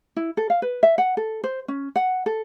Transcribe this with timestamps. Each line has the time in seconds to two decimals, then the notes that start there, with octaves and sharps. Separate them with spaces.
0.17 E4
0.37 A4
0.50 F5
0.62 B4
0.83 E5
0.98 F#5
1.17 A4
1.44 C5
1.68 C#4
1.96 F#5
2.26 A4